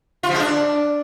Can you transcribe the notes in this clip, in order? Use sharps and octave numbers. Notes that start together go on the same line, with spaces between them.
F4
F3
G#3
D4